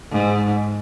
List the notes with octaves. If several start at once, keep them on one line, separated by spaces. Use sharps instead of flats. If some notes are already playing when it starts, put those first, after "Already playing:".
G#2